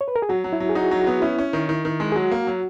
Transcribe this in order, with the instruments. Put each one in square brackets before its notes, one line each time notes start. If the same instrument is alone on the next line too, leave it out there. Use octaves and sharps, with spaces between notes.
[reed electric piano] C#5
B4
A#4
G#4
[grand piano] F#3 [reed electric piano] F#4
[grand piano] F#3
[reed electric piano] E4
[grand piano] F#3
[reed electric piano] G#4
[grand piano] D#4 [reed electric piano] F#4
[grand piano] F#3 [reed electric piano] F#4
[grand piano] B3 [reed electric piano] F#4
[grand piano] C#4 [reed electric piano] E4
[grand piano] C#4
D#3
D#3
D#3
G#3
[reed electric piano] G#4
[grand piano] F#3 [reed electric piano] F#4
[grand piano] A#3
F#3